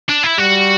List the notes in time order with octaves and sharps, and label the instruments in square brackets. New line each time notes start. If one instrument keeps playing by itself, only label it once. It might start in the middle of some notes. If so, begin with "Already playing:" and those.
[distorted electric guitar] D4
E4
[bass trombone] G3 [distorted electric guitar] F#4